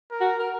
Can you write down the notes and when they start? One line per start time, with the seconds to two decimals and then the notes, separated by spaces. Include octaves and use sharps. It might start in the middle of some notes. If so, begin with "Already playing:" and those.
0.11 A#4
0.21 F#4
0.39 A#4